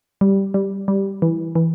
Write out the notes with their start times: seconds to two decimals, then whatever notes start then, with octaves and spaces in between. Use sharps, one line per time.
0.21 G3
0.54 G3
0.88 G3
1.22 E3
1.55 E3